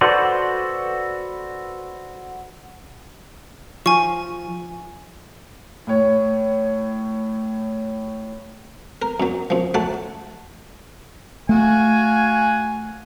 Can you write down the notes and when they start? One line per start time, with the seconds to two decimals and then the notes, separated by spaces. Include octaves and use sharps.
0.01 F#4 A4 B4 C5 D5
3.86 F3 G#5 C#6
5.87 A2 C#5
9.02 A#4
9.20 F#2 F#3
9.50 F#2 F3
9.74 F#3 A3 F#5 A5
11.49 A3 F#4 F5 G#5